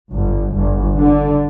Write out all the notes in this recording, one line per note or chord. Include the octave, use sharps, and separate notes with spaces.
G1
G1
D3